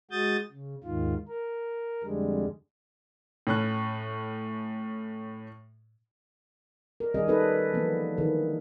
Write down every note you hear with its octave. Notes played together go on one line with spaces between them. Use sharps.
G#3 F#4 D#6 G6 A6
C#3
D#2 G#2 D#3 F4
A#4
F2 D3 G3 G#3
A2 C#4 F#6
A#4
D#3 G3 C#4 G#4 D#5
G3 B3 C#4 D#4 A4 B4
E3 F3 A#3 B3
D3 D#3 E4 G#4 A#4